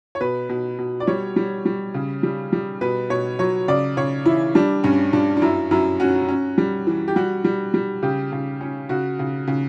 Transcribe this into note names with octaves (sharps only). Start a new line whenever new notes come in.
C#5
B2 B4
B2
B2
D5
G3 C#5
G3
G3
C#3
G3
G3
B2 B4
B2 C#5
F#3 C#5
C#3 D5
C#3 C#5
E3 E4
G3 D4
G2 C#4
G2 D4
D4
F#2 E4
F#2 E4
C#4 F#4
C#4
G3
E3
G4
G3 F#4
G3
G3
C#3 G4
C#3
C#4
C#3 F#4
C#3
C#3